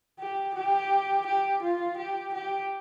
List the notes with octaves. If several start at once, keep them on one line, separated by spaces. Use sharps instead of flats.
G4
G4
G4
F4
G4
G4